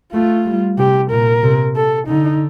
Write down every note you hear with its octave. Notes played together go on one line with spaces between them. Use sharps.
A3 F4
G3
C3 G4
A#2 A#4
C3
A4
D3 D#4